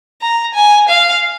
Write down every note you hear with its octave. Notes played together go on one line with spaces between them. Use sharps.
A#5
G#5
F5